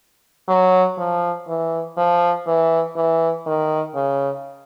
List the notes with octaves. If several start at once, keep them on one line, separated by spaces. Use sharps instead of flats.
F#3
F3
E3
F3
E3
E3
D#3
C#3